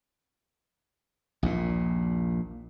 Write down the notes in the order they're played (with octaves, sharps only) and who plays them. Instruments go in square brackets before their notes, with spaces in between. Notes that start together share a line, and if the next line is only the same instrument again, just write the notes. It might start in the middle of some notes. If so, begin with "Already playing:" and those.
[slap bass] A#1 D#2 A#2